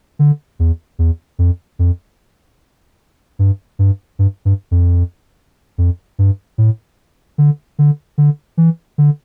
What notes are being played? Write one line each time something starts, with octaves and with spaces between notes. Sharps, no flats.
D3
E2
E2
F2
F2
G2
G2
G2
G2
F2
F2
G2
A2
D3
D3
D3
E3
D3